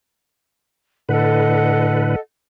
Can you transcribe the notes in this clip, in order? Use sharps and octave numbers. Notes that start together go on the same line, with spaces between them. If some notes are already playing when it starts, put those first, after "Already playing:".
A2 D3 A4 B4 D#5 F#5